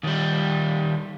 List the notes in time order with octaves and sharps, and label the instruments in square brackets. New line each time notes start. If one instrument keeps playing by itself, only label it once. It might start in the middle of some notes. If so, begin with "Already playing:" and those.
[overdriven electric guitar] D#2 G3